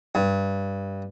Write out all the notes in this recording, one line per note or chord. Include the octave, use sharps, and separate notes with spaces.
G2